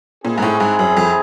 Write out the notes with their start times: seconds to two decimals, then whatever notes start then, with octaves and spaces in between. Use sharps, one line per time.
0.25 A#2 C4 E4 G#4
0.38 G#2
0.42 A2
0.60 G#2
0.79 F#2
0.97 F2